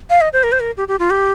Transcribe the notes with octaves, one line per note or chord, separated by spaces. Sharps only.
F5
D#5
C5
A#4
C5
A#4
G4
G4
F4
G4